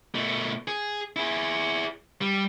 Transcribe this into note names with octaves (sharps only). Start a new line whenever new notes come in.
B2 A3
G#4
E4 G#4
G3